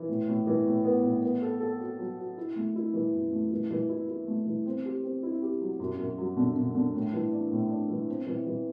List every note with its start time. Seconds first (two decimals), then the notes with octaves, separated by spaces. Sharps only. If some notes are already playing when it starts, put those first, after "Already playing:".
Already playing: E3
0.08 A2
0.28 A2
0.47 E3
0.66 A2
0.84 B3
1.03 A2
1.23 B3
1.42 A4
1.60 A4
1.80 F#4
1.99 F#3
2.18 F#4
2.38 E4
2.56 A3
2.76 E4
2.94 E3
3.13 F#2
3.33 A3
3.51 E3
3.71 E3
3.89 E4
4.09 E4
4.28 A3
4.46 E3
4.66 C4
4.85 G4
5.04 C4
5.23 E4
5.42 G4
5.61 F#3
5.80 F#2
5.99 F#2
6.18 F#3
6.37 D3
6.56 D3
6.75 D3
6.93 A2
7.13 E3
7.32 D4
7.52 A2
7.70 D4
7.90 E3
8.08 C4
8.27 E3
8.47 E3